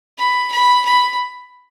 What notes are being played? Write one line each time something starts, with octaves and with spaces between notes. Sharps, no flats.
B5
B5
B5